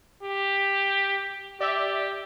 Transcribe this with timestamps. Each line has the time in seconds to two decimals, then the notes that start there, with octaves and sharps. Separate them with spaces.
0.23 G4
1.60 G4 D5 E5